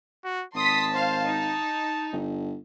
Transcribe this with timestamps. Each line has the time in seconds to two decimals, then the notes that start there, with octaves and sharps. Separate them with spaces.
0.25 F#4
0.55 G#1 A5 C6 D#6 B6
0.92 C5 F5
1.26 D#4
2.12 G1